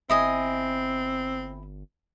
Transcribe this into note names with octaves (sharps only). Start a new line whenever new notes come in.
G1 C4 E4 D#5 G#5